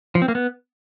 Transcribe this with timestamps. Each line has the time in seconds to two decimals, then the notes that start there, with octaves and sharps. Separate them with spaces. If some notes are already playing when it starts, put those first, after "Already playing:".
0.15 F3
0.22 C4
0.28 A#3
0.35 B3